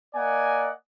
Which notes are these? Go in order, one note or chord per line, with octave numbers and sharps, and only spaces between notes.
A#3 D5 D#5 F#5 G#5